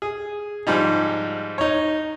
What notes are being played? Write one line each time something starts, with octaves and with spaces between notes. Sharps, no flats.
G#4
G#2 F3 G3 D#4
D#4 C#5